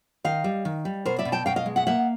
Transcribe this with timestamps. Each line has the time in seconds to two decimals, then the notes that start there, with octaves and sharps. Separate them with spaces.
0.24 D#3 D#5 F5
0.44 G3
0.65 D#3
0.85 G3
1.05 B2 A#4 C5
1.19 D5 E5
1.25 B2
1.32 G5 A5
1.46 B2 F5 G5
1.56 D#5 F5
1.66 G#3
1.76 E5 F#5
1.87 A#3 E5 F#5